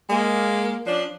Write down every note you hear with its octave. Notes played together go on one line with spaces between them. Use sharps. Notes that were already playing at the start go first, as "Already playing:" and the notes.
G#3 A#3
F3 C#4 D4